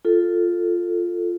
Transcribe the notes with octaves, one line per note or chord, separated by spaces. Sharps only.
F4 A4